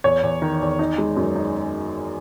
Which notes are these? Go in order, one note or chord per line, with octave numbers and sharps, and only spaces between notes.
E2 C#5
E2
D#3
E2
D#4
G#3
F#2
D#4